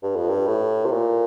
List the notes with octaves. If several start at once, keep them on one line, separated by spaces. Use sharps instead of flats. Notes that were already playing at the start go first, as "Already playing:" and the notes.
G2
F2
G2
A2
C3
A#2